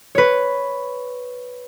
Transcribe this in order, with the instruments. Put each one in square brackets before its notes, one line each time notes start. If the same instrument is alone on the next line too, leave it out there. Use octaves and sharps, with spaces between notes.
[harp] B4 C#5